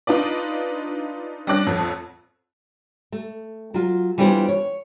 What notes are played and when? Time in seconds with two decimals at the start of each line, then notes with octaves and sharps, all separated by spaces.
0.07 D4 D#4 F4 B4 D5
1.47 G3 C#4 D4 D5 F#6 A#6
1.67 A1 F2 A4
3.12 A3
3.74 F#3 F4
4.18 E3 G3 B3 D4 F4 C5
4.49 C#5